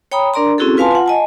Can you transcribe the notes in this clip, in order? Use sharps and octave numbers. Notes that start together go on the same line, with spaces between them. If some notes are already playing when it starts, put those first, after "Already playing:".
C#5 G5 A#5 B5 D#6
D4 A#4 D5 A#5 C6
C4 C#4 E4 F#4 G#4 A4
F4 B4 F5 G#5 A5 C6
F4 F#5
D#5 G#5 A5